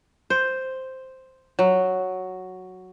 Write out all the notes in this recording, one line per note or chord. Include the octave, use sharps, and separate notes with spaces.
C5
F#3